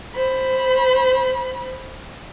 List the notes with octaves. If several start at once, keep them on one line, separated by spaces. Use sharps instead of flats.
C5 B5